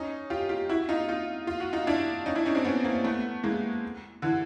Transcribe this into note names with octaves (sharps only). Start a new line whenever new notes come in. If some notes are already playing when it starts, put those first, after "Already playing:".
Already playing: C#4 D#4
F4 G4
F4 G4
E4 F#4
D#4 F4
D#4 F4
F4
F#4
D#4 F4
D4 E4
C#4 D#4
D4 E4
C#4 D#4
C4 D4
B3 C#4
A#3 C4
A3 B3
G#3 A#3
D3 E3